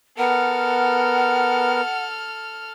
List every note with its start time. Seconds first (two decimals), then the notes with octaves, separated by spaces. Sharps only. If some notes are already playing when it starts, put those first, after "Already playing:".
0.18 B3 A4 A#4 F#5 F6